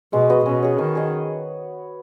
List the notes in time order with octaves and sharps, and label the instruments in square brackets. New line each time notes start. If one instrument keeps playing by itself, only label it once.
[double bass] B2 [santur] G#3
[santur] B3 F#4 D#5
[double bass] B2 [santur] C#4
[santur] G#4 C#5
[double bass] D#3 [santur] C#4
[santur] G#4 D#5